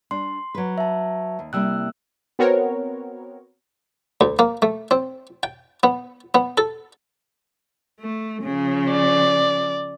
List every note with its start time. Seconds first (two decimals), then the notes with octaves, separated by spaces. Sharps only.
0.11 G3 D4 C6
0.55 F#3 B4
0.78 E5 A5
1.39 D#2
1.53 C3 G3 A#3 E4 E6 F#6
2.39 B3 C4 F#4 A#4 C#5
4.21 D2
4.39 A#3
4.62 A3
4.91 C4
5.43 G5
5.83 B3
6.35 B3
6.58 A4
8.00 A3
8.42 C#3 F3
8.92 D5